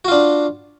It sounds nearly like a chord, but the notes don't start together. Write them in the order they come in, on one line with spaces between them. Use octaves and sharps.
F#4 F4 D4